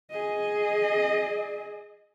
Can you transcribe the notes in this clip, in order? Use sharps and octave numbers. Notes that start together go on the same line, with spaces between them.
G#4 D#5